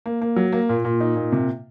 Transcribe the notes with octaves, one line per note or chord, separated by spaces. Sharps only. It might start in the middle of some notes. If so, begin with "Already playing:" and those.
A#3
A#3
F#3
A#3
A#2
A#2
D#4
A#2
C3